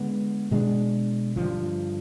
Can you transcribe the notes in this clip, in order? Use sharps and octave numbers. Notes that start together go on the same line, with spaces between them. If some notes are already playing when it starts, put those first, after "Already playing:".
Already playing: D3 G#3 B3
B2 G#3 D4
G2 D3 F3